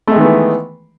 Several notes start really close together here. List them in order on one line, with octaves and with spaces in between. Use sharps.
A3 G#3 D#3 B3 E3